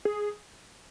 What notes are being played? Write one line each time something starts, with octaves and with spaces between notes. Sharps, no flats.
G#4